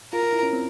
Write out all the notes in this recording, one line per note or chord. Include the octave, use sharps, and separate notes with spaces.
F4 A#4
F4
E4
C#4
C4